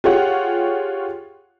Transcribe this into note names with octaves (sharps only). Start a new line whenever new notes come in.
F4 G4 G#4 C#5 F#5